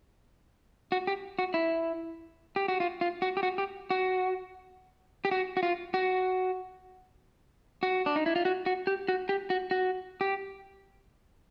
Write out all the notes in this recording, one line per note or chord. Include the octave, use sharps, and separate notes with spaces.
F#4
G4
F#4
E4
G4
F#4
F4
F4
F#4
G4
F#4
G4
F#4
G4
F#4
F#4
F4
F#4
F#4
D4
D#4
E4
F4
F#4
F#4
G4
F#4
G4
F#4
F#4
G4